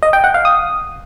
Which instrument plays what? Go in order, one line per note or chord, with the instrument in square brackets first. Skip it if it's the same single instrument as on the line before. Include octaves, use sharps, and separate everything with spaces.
[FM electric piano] D#5
G5
F#5
F5
D#6